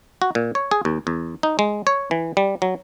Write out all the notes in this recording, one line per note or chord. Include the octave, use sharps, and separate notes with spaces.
F#4
A#2
C#5
G#4
D#2
E2
D#4
G#3
C#5
E3
G3
F#3